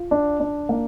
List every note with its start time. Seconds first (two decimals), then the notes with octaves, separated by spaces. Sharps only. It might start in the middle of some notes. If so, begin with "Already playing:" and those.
Already playing: F4
0.11 D4
0.40 D4
0.69 A#3